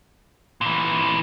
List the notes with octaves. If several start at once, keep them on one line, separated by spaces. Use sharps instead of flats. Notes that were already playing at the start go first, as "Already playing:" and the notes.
A#2 E3